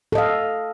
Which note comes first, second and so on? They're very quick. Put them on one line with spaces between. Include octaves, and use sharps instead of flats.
A4 D#5 F5